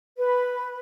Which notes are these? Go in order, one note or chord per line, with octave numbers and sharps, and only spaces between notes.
B4